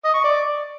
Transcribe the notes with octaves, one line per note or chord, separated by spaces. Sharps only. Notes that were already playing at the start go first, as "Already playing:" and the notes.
D#5
C#6
D5